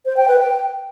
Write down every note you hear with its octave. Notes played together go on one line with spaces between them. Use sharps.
C5
G5
B4
G5